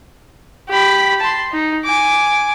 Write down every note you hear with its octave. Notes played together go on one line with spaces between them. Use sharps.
G4 B5
A5 C6
D#4
G#5 D6